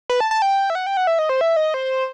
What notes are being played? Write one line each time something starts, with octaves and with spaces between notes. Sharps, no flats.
B4
A5
A5
G5
E5
F#5
G5
F#5
E5
D#5
C5
E5
D#5
C5